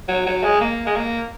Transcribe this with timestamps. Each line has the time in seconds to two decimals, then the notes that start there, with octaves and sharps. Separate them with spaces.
0.08 F#3
0.26 F#3
0.43 G#3
0.61 A#3
0.86 G#3
0.96 A#3